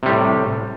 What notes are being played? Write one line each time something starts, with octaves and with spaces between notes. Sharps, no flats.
A2 C3 G3